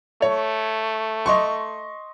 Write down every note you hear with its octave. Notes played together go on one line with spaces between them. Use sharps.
A3 C#5
D#5 C6 C#6